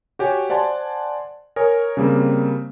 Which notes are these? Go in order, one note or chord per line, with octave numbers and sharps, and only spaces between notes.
F#4 G4 C#5 G#5
C5 D5 F#5 G#5 A5 C6
A#4 C#5 G#5 D#6
C#3 G3 A#3 C4